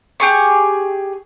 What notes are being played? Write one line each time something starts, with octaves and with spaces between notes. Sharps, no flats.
G4 G#4 C#6